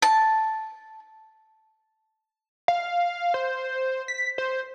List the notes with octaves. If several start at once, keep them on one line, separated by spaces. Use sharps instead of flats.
A5
F5
C5
B6
C5